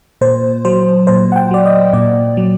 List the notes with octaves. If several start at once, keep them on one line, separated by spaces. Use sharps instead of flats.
A#2 C5
F#3 C5
A#2 C5
F#5
G5
F#3 D5
D#5
A#2 D5
F#3